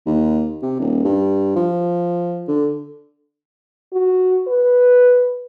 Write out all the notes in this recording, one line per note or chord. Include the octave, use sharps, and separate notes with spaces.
D#2
C3
D#1
G2
F3
D3
F#4
B4